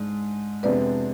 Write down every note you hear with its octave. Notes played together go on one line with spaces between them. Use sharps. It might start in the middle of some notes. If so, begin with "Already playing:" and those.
Already playing: G#2 G#3 D4
F2 C3 G#3 B3 D4 B4 D5